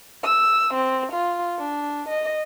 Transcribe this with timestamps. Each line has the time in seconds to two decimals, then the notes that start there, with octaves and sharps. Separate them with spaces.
0.23 E6
0.74 C4
1.12 F4
1.58 D4
2.09 D#5